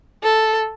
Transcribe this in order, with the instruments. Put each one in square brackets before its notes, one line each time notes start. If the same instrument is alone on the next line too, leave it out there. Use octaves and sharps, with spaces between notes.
[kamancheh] A4